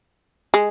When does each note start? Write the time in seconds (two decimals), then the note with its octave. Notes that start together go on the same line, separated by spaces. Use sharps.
0.54 G#3